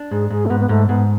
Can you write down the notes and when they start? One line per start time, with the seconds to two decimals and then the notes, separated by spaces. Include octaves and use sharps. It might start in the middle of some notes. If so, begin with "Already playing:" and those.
Already playing: D4
0.11 G#2 G#4
0.30 G#2 G#4
0.46 A3
0.50 G#2 B3
0.60 B3
0.69 G#2 A3
0.88 G#2 B3